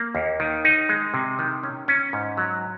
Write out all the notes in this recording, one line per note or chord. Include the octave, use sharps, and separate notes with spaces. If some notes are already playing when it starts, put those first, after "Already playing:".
Already playing: A#3
D#2
D#3
D#4
G#3
C3
D#3
C#4
C#4
G#2
F#3